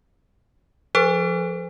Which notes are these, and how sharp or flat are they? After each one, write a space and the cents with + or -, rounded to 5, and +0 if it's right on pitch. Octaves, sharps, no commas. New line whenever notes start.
F3 +0 A4 -35 C5 -45